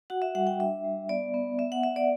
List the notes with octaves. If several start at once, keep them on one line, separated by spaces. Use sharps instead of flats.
F#4 F#5
E5
G3 F#5
G5
D4 E5
G3
B3 D5
B3
B3 E5
F#5
B3 E5
D5